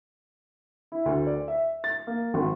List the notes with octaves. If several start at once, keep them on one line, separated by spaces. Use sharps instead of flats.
E4
D2
D5
E5
A6
A#3
G#1